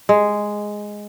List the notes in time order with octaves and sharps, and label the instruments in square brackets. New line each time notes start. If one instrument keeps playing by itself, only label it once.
[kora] G#3